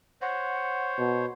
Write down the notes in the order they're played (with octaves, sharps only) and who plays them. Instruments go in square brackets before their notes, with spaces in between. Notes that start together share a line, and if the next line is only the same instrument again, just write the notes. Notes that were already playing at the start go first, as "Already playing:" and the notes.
[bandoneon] C5 C#5 [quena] F#5
[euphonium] B2